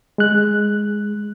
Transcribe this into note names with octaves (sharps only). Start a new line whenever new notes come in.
G#3 F#6